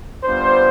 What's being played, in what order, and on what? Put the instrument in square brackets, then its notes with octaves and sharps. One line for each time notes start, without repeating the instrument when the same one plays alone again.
[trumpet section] G3 B3 D4 F4 C5